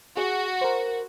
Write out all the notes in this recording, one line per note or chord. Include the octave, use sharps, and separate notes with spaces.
F#4 G#4
A#4 C5